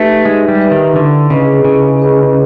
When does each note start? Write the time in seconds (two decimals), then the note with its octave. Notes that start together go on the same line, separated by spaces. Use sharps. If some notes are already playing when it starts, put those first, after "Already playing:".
Already playing: A3 D#4 G4 B4 E5
0.25 G#3 D#4
0.48 G3
0.60 G4 B4 E5
0.71 D#3
0.95 D3 E4
1.30 C#3 G#4 B4 D#5
1.65 C#3 E4
2.00 G#4 B4 D#5